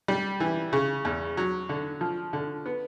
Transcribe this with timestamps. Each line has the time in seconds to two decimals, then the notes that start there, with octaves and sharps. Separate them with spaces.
0.08 G3
0.40 E3
0.73 C#3
1.05 E2
1.37 F#3
1.69 D3
2.01 F3
2.33 D3
2.66 B3